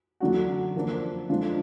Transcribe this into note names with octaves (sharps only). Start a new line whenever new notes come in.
D3 F#3 D4 F#4
F3 A#3 D4
D3 F3 G#3 D4 F4